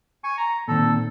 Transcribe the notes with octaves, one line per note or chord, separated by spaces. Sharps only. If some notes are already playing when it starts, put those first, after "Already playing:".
G#5 C#6
A#5
A#2 D#3 C4 A4